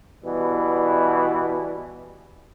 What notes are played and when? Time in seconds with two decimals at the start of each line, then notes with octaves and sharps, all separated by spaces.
0.24 B2 E3 G3